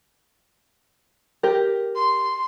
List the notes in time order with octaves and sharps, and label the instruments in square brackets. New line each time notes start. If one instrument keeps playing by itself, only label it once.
[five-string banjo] G4 A#4
[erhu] C6